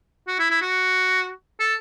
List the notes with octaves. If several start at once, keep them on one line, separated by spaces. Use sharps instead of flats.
F#4
E4
E4
F#4
A4